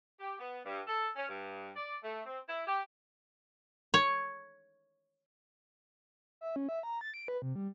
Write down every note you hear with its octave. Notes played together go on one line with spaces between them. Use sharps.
G4
B3
G2
A4
C#4
G2
D5
A3
C4
E4
G4
C#5
E5
C#4
E5
A#5
A6
D7
B4
C3
G3